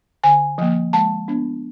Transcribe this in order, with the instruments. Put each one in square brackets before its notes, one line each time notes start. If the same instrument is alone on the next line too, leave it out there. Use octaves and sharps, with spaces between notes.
[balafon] D3 G#5
F3 A#3
G#3 A5
B3 D4